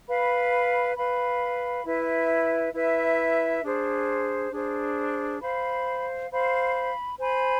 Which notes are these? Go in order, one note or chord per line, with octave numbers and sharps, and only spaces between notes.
B4 F5 B5
B4 F5 B5
E4 B4 E5
E4 B4 E5
D4 G#4 C5
D4 G#4 C5
C5 F5 B5
C5 F5 B5
C5 G#5 B5